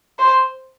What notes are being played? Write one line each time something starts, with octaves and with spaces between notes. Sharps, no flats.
C5